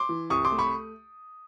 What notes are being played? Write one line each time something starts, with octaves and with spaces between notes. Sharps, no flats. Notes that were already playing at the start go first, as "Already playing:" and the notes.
Already playing: C6 D6
E3
C2 C#6 D#6
C6 D6
A3
B5 C#6